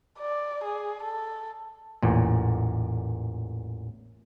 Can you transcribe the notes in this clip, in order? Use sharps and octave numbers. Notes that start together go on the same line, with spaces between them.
D5
G#4
A4
A1 E2 A#2